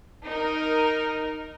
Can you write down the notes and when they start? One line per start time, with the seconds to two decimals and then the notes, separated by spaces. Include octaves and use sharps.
0.24 D#4 A#4